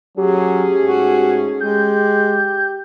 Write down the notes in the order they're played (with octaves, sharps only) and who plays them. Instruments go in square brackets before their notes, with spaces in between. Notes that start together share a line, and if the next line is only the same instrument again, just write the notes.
[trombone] F#3 [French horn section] A3 C#4 G#4 [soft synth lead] G4
[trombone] G#2 [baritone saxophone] F#4
[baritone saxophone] G#3 [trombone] G4 [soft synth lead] G6